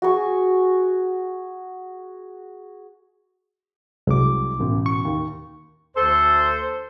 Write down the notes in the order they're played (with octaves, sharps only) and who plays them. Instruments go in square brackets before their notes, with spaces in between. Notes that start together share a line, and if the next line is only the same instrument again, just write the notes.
[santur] F#4 G#4 C#6
[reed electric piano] C2 D6 [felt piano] F#3 G#3
[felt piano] A1 B2
[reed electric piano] C#6
[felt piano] D#2
[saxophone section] D2 A4 C5